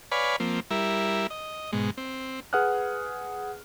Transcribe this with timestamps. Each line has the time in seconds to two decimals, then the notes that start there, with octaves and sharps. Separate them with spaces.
0.12 B4 C#5 D5 F5 G#5 B5
0.40 F3 A#3 C4
0.71 G3 E4 A#4 E5
1.30 D#5
1.73 G#2 B2 G#3
1.97 C4
2.53 G#4 B4 F#5 D#6 F6 F#6